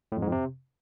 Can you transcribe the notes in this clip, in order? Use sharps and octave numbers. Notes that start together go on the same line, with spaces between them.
A2
F2
G#2
F2
C3